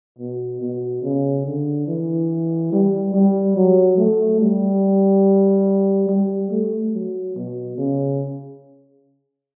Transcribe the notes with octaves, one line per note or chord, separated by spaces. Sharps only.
B2
B2
C#3
D3
E3
G3
G3
F#3
A3
G3
G3
A3
F#3
B2
C#3